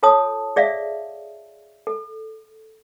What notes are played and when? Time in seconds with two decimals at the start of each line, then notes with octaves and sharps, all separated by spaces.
0.03 F4 A4 C#5 A5 D#6
0.56 G#4 D5 E5 F5
1.87 A4